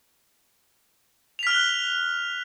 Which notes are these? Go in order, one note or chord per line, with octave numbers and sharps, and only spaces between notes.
F6 F#6 B6 F7 G7